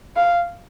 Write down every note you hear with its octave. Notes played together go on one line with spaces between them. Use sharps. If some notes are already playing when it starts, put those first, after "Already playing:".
F5